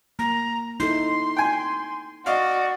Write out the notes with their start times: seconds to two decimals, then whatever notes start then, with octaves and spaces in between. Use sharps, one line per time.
0.19 A#3 A#5
0.80 D#4 E4 A4 C6
1.37 G5 G#5
2.26 F#4 D5 D#5 F5